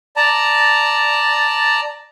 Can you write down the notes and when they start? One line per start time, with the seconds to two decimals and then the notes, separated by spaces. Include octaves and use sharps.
0.16 D5 A5 A#5